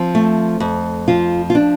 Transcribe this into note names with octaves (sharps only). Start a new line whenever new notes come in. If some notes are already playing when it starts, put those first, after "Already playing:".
Already playing: F3 C4
A3
F2
F3 F4
F4
D4